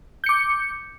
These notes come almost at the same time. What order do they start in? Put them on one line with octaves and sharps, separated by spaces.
G6 C#7 D6